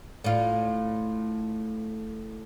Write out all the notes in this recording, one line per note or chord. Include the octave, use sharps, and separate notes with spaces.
A2 F4